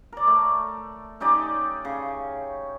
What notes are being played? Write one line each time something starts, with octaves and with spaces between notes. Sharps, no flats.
A#4 D5
A3
C#4 D#4 G4 D5
C#3